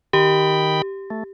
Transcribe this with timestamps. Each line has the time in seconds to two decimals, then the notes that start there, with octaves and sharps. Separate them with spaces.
0.13 D#3 G4 G5 B5
1.10 A3